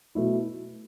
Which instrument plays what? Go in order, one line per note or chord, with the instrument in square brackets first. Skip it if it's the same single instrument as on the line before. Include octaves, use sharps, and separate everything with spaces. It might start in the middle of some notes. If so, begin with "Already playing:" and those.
[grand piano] B2 F#3 A3 E4